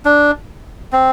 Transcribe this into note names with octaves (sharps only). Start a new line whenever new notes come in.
D4
C4